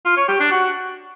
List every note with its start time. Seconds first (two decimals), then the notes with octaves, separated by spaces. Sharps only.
0.06 F4
0.17 C#5
0.28 G4
0.40 D4
0.51 F#4